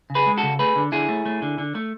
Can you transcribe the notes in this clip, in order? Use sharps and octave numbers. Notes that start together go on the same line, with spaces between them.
C#3
G#4 B4
G#3
F#4 A4
C#3
A3 G#4 B4
D3
D3 E4 G#4
A3
A3
D3
D3
A3